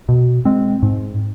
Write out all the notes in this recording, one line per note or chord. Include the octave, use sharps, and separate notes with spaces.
B2
G#3 C4
G#2